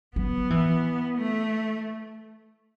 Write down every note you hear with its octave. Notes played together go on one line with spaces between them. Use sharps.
F#3 B3
E3
A3